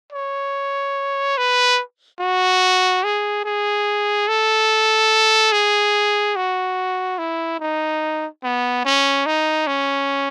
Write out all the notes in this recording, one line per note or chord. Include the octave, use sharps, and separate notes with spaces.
C#5
B4
F#4
G#4
G#4
A4
G#4
F#4
E4
D#4
B3
C#4
D#4
C#4